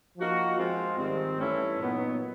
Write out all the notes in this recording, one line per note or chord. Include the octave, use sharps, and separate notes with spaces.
F3 A#3 D#4 F#4
F3 G#3 C4 F4
G#2 D#3 G3 C4
G2 E3 A3 C#4 E4
A#2 F#3 B3 D#4